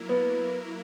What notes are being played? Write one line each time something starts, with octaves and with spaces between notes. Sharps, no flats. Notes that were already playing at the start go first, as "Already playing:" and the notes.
Already playing: F#3 A#3 E4 A#4
B3